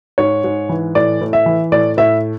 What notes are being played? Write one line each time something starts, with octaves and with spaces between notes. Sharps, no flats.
G#2 C#5
G#2
E3
A2 D5
A2
E5
E3
A2 D5
A2 E5